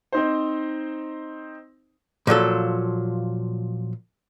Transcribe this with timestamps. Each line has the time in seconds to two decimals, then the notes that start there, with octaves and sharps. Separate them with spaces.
0.12 C4 D#4 C5
2.27 A#2 F3 F#3 A4